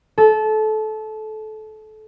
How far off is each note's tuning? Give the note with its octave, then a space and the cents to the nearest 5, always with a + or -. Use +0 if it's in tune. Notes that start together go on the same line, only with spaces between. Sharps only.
A4 -25